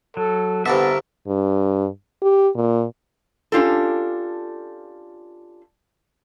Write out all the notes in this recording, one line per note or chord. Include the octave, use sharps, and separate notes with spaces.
F#3 A4
C2 G2 D3 B3 A#4 E5
G2
G4
A#2
C#4 D4 F4 G4 A4